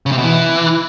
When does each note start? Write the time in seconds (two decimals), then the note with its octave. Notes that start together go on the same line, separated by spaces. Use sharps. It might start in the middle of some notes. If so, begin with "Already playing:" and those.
0.06 C#3
0.12 C3
0.18 B2
0.24 E3